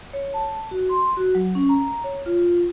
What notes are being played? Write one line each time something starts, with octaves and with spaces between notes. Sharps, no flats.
C#5
A5
F#4
C6
F#4
F#3
C#4
A#5
C#5
F4